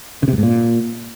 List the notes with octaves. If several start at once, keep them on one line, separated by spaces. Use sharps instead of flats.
C#3
C3
G2
G#2
A#2